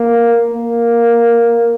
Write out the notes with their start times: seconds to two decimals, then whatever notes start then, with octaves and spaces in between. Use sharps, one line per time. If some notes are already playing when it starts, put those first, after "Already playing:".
Already playing: A#3
0.54 A#3